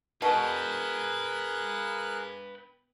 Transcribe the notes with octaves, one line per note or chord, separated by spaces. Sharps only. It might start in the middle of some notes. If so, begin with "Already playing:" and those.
B2 G#4 A#4 B4 G5 F#6